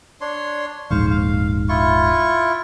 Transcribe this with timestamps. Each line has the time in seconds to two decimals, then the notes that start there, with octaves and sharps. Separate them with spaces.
0.21 D4 C#5 C6
0.90 D#1 A#1 G#2 C5 F5 C#6
1.10 F5
1.69 E4 F4 C#6